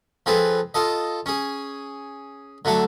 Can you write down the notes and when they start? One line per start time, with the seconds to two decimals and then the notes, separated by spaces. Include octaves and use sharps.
0.26 F3 C4 G#4 A4 B4
0.74 F4 A4 D#5
1.26 C#4 G#4
2.65 D3 F#3 A3 A4